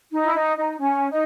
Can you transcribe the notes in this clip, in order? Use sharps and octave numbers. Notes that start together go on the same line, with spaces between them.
D#4
E4
D#4
D#4
C#4
D#4